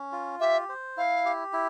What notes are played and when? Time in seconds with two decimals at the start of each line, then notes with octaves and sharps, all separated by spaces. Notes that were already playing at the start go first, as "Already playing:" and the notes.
Already playing: C#4
0.12 F4
0.40 G4 E5
0.69 C5
0.97 E4 F5
1.25 G4
1.53 E4